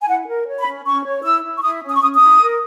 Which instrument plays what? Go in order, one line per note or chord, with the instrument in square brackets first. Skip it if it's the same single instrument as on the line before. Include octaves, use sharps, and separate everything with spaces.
[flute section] G#5
E4 F#5
A#4
C#5
B5
C#4
C#4 C#6
C#5
E4 E6
E4
C#6
E4 D#6
C#4
D#6
C#6
C#4 D#6
D#6
E4
A#4